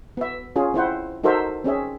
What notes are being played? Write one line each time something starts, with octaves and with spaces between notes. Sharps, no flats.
B3 E5
C#4 F4 G#4
C4 E4 C5 F#5
D#4 F#4 A4 A#4 C5 E5
C4 C#4 G#4 E5